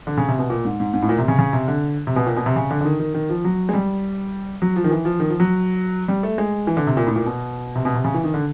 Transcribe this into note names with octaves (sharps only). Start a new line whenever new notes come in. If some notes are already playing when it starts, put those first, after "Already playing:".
D3
C#3
C3
B2
A#2
G#2
G#2
G#2
A2
A#2
C3
C#3
C#3
C3
D3
C3
B2
A#2
B2
C3
C#3
D3
D3
D#3
D#3
D#3
F3
F#3
G#3
G3
F#3
F3
D#3
E3
F3
D#3
F3
F#3
G3
A3
G#3
E3
D3
C3
A#2
A2
A#2
B2
C3
B2
C3
C#3
E3
D#3
D3